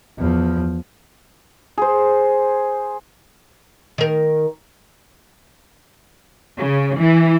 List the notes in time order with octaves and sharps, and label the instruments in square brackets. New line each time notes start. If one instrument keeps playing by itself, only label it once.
[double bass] E2 F3
[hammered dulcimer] G#4 C5
[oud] D#3 A#4
[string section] C#3
E3